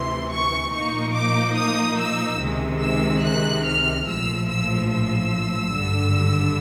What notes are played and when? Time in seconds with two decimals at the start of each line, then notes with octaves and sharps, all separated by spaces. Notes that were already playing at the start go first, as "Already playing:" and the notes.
Already playing: D2 C3 E3 C6
0.31 C#6
0.72 A#2 F3 A#3 D#4 C#6
1.14 D6
1.57 D#6
1.98 E6
2.40 C#2 C3 D#3 G#3
2.82 E6
3.24 F#6
3.65 F6
4.07 A#1 A2 F3 E6
4.49 E6
4.91 E6
5.74 G#1 G2 D3 G3